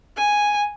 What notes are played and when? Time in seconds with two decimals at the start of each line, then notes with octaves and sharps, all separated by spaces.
0.17 G#5